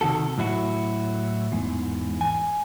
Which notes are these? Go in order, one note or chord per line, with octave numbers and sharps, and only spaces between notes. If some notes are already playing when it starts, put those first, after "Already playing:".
C3 D#3 F#4 A4
A2 F#3 E4 F#4
E2 G#2
G#5